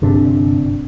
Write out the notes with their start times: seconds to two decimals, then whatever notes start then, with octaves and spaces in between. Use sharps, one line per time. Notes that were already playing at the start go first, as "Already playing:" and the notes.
0.02 G1 C3 D4